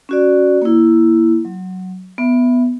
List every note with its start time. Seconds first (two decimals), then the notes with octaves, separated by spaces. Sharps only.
0.09 C#4 F#4 D5
0.62 A#3 E4
1.45 F#3
2.18 B3 E5